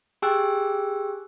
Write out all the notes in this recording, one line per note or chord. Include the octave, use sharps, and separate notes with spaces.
G4 G#4 G5 G#5 E6 F#6